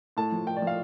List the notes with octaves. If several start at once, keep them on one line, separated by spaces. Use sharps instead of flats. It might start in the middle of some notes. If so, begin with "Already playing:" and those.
A2 A5
F3
A2 G5
D5
F3
F5